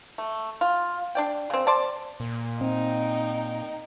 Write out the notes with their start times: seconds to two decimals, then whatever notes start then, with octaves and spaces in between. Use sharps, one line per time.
0.18 A3
0.61 F4
1.15 D4 D5 G5
1.50 C#3 C4
1.67 C5 D5 A5
2.20 A#2
2.61 C4 D#4 G5